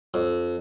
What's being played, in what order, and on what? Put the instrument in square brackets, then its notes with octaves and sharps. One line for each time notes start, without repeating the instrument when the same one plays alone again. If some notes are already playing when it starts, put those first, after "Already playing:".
[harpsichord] F2